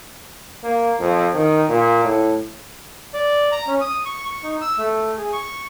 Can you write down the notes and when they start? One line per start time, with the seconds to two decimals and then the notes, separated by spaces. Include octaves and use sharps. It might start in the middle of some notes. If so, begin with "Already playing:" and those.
0.63 A#3
1.00 F2
1.35 D#3
1.69 A#2
2.03 A2
3.14 D5
3.52 A#5
3.67 C#4
3.81 D#6
4.05 C#6
4.25 C#6
4.43 D#4
4.61 E6
4.78 A3
5.17 G#4
5.33 C#6